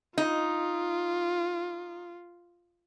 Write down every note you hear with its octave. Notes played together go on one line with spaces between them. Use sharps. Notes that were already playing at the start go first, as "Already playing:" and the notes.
D#4 F4